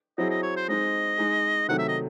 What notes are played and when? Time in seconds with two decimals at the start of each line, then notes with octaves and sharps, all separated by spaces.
0.18 F#3 C4 E4 G#4 D#5
0.30 D#5
0.43 C#5
0.56 C5
0.68 G#3 C4 D#4 D#5
1.18 G#3 D#4 G#4
1.68 C3 D#3 F#3 A3 F#5
1.78 E5
1.88 D#5